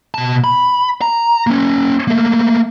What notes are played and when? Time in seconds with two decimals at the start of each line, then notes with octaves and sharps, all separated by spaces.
0.14 B2 A5
0.44 B5
1.01 A#5
1.47 A#3 C#4
2.08 A3 A#3